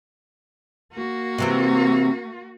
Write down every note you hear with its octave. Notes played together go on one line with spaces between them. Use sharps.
A#3 F#4
C3 E3 C4